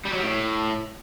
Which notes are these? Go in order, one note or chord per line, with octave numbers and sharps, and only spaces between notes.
G3
F#3
G3
A2